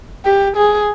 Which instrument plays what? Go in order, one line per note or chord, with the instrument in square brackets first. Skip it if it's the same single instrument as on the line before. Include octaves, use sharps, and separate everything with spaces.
[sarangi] G4
G#4